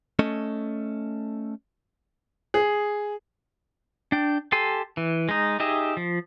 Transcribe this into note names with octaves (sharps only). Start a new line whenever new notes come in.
A3 C#4 A4 D#5
G#4
D4 G5
G4 A4 G#5 C6
E3
G#3 D#4
D#4 G4 G#4 D#5 E5
F3